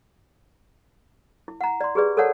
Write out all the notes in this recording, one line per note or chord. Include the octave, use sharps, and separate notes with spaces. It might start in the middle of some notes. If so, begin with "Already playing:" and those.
E4
F#5 A#5
D5 C6
G4 G#4 B4 D5
A4 A#4 C#5 D5 F#5 A5